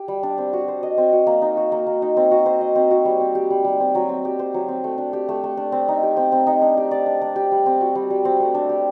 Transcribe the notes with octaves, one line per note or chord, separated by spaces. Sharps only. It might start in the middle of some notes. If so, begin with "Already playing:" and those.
Already playing: G4
G3
D4
C4
F#4
C5
D#5
C4
F#4
A#3
D#4
F#4
A#3
A#3
D#4
C4
F#4
C5
D#5
C4
F#4
G3
C4
G4
G3
G3
C4
F#3
C4
G4
C5
F#3
C4
A3
D4
G4
A3
A3
D4
C4
D#4
G4
C4
C4
D#4
D4
G4
D5
D4
D4
G4
G3
C4
F#4
G3
G3
C4
A3
D4
G4